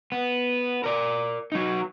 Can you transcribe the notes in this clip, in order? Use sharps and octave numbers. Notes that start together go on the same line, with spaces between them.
B3
A#4 D5
F#3 D#4